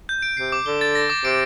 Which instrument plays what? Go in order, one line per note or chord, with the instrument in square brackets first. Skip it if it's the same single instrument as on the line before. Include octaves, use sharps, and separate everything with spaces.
[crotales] G6
D7
[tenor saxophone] C3 [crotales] C7
[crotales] D6
[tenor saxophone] D3 [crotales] G7
[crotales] A6
A#6
D6
[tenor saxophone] C3 [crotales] D7